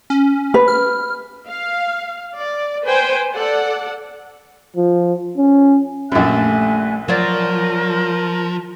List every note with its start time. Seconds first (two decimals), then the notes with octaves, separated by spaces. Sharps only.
0.10 C#4
0.54 B4
0.68 F6
1.49 F5
2.38 D5
2.84 B4 C5 G5 G#5
3.35 A4 D5 F#5
4.76 F3
5.37 C#4
6.12 A#1 F#2 G3 A3 E5 G#5 F#6
7.08 F3 F#3 A#4 C5 D5